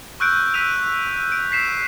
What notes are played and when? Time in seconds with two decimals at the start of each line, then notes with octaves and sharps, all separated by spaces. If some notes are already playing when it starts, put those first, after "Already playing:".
0.20 C#6 E6 F#6 G6 D7
0.54 E6 B6 D#7 F7
1.32 D7
1.52 B6 C7 E7